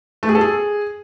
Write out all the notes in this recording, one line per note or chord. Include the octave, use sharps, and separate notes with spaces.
A3
G#4
A4
G#4